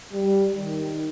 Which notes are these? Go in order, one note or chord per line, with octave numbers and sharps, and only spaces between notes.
G3
D#3